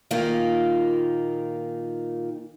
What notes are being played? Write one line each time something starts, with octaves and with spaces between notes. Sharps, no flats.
A#2 D#3 A#3 D#4 F4